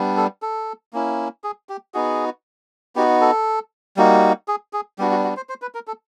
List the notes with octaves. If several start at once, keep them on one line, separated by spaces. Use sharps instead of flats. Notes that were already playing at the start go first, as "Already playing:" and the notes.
Already playing: G3 B3 D4
A4
A4
A#3 C#4 E4
G#4
G4
B3 D#4 F#4 G#4
B3 D#4 F#4 G4
A4
G3 A#3 D#4 F#4
G#4
G#4
G3 B3 D4 F#4 G4
F#4
F#4
C5
C5
B4
A#4
A4